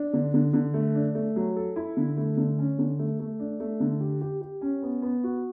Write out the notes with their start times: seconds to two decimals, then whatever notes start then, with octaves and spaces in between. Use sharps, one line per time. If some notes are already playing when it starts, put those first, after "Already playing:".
Already playing: D4
0.13 D3
0.34 D3
0.53 D3
0.74 A3
0.95 D4
1.15 A3
1.36 F#3
1.56 A4
1.76 E4
1.97 D3
2.17 A3
2.37 D3
2.59 C#4
2.79 D3
2.99 A3
3.19 A3
3.40 D4
3.60 A3
3.80 D3
4.00 G4
4.21 G4
4.41 G4
4.61 C#4
4.82 B3
5.02 B3
5.24 F#4